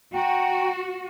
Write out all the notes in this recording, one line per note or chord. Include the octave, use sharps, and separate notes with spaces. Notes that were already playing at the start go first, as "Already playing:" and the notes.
F#4 F#5 G5 A#5